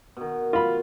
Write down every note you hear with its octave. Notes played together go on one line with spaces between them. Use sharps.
B2 D#3
F4 B5